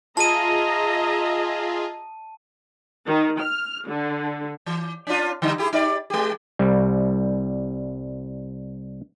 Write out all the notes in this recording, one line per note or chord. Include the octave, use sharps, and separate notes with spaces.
F4 G#4 D#5 E5 A5 A#5 D#7
D#3
F6
D3
E3
C#4 D4 F4
D3 G3 D#4
E4 G4 G#4
D#4 G4 D5
G#3 G4
C2 G3